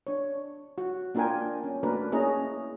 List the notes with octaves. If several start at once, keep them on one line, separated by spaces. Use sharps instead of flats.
D4 C#5
F#4
A#3 D4 F4 A#4 G5 G#5
C#4
A3 A#3 D4 F#4 A#4 B4
A#3 C#4 E4 G#4 D#5 A#5